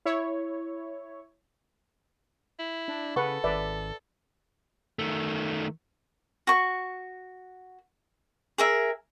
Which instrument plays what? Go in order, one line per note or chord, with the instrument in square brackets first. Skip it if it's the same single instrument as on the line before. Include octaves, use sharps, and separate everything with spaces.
[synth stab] E4 C#5
[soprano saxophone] E4
[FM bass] D4
[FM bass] C#3 [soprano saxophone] A4 [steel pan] B4 F#5 C#6
[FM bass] G#1 [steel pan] B4 D5 E5
[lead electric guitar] D#3 A3
[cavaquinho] F#4 C#6
G#4 A#4 E5